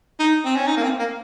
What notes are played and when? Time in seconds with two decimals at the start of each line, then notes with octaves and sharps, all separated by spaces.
0.19 D#4
0.45 C4
0.56 C#4
0.67 D#4
0.77 A#3
0.84 C4
0.99 A#3